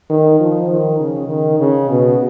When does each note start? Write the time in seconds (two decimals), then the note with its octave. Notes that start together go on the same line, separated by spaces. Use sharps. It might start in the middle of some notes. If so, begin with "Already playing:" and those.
0.10 D#3
0.40 F3
0.70 D#3
1.00 C#3
1.29 D#3
1.60 C#3
1.90 B2